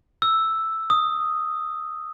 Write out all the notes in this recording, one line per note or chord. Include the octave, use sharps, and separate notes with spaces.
E6
D#6